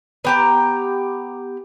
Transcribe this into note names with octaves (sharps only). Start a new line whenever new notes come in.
B3 G4 A#5